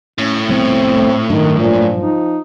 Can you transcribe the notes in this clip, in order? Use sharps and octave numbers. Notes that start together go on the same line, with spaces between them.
A2 C#4
C2 F3 B3 C4
A3
G2 D#3 F#3 D4 D#4
A#2 F3
D#4